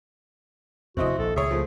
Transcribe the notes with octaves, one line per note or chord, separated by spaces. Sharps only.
F1 D#2 C4 E4 F#4 D#5
A#1 A4
C#2 A#2 G#4 C#5 E5
F3 A3